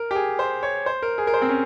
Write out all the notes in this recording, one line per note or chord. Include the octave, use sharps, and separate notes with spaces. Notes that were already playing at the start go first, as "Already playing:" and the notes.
Already playing: A#4
G4
G#4
C5
C#5
C5
A#4
G#4
A#4
C5
C4
C#4